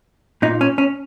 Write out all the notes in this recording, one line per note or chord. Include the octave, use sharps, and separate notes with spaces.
A#2 D#4
C#4
C#4